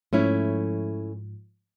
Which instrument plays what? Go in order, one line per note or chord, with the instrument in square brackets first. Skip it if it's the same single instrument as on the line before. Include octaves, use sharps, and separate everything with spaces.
[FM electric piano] G#2 F3 [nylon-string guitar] A3 C#4 E4